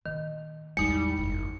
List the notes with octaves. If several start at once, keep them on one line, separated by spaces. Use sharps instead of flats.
A#2 D#3
A1 E2 G3 G#3 D#4 C#7
F#1